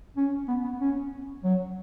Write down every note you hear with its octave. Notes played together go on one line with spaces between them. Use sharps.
C#4
B3
B3
C#4
F#3